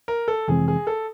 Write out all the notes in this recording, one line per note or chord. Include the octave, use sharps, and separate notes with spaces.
A#4
A4
F2 C3 E3 G#3 C4 G#4
G#4
A4